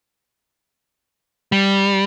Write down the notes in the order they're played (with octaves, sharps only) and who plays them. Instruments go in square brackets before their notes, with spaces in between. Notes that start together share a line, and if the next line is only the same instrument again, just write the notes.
[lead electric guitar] G3